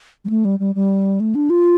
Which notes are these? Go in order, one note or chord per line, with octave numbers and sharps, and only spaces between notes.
G3
A3
G3
G3
G3
A3
D4
F4